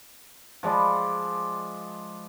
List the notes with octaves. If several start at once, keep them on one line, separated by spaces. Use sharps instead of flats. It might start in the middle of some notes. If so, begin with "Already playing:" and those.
F3 G#3 D5 B5